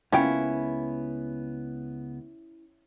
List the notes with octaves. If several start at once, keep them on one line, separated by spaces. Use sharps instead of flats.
C#2 A#3 B3 C#4 E4 F4 G5